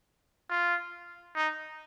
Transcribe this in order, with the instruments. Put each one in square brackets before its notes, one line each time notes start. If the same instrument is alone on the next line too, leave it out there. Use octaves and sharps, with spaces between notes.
[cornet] F4
D#4